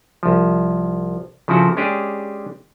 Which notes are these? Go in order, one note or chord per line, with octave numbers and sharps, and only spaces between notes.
C2 F3
C#3 F3 C4 E4 F#4 A4
G#3 C#4 D4 G4 G#4